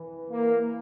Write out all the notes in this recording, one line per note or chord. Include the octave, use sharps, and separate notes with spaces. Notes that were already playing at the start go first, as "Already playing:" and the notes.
Already playing: E3
A#3